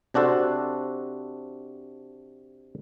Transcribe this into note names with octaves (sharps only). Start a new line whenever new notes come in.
C3 D4 F#4 A4 C5